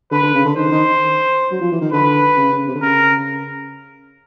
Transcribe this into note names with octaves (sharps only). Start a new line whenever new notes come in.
D3 B4
D3
C#3
D3
D#3 C5
D#3
F#3
F3
E3
D#3
D3 B4
C#3
C#3
C3
D3
C#3 A#4